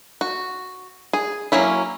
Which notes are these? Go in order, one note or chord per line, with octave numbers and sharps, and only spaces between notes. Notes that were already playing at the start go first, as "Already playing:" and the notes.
F#4
G#4
F#3 A#3 C#4 E4